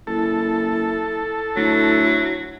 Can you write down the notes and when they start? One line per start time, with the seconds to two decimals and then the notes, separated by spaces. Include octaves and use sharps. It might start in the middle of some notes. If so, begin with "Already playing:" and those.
0.07 F#1 E4 A4
1.56 D2 F#3 E4